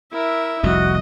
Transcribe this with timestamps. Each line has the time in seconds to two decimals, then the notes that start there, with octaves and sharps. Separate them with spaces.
0.12 E4 A#4 E5
0.63 F1 C2 F2 F#4 D#5